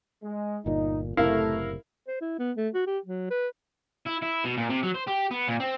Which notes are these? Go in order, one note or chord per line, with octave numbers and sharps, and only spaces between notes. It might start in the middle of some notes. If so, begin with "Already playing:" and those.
G#3
G1 A#2 D#4
F#1 A2 C3 A3 E4 A#4 F5
C5
E4
B3
A3
F#4
G4
F#3
B4
E4
E4
B2
A#2
C3
F#3
C5
G4
B3
A#2
C4